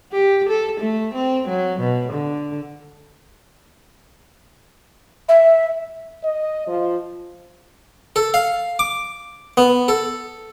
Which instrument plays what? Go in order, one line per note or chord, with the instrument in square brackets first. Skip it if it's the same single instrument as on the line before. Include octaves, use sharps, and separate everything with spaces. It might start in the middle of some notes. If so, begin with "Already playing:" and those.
[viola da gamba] G4
A4
A3
C4
F#3
B2
D3
[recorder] E5
[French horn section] D#5
F3
[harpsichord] A4
F5
D6
B3
A4